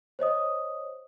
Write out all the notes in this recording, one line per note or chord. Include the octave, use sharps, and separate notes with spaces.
C5 C#5 D#5 D#6